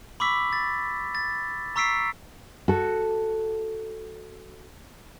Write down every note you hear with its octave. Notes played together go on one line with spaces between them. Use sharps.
B5 C#6 D6 E6 B6
A6
A6
A#5 C#6 E6 B6 C7 D7
F#4 A4